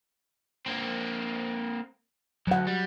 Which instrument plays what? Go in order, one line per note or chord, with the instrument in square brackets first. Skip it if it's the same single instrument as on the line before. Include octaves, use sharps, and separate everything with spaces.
[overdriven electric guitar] A#3 C4
[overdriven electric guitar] D2 [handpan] F#3 F#5
[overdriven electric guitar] G3